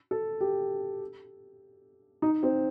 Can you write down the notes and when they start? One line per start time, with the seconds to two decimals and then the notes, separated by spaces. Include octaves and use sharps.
0.11 A4
0.40 G4
2.22 D#4
2.43 C4